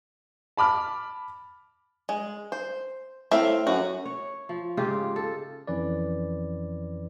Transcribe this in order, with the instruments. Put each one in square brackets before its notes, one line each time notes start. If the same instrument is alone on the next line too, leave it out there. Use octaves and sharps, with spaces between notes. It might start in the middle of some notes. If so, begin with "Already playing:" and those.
[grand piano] A5 B5 D6 F6
[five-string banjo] G#3
C5
[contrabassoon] A2 [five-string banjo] C4 E5 F5
[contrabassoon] F#2 [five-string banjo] F#4
[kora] C#5
F3
G#2 C#3 F4 G4
A4
[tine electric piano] F2 E3 C#4 B4 D5